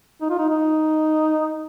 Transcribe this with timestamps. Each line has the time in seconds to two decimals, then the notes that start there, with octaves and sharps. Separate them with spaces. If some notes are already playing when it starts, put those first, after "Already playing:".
0.21 D#4
0.30 F4
0.39 D#4
0.49 D#4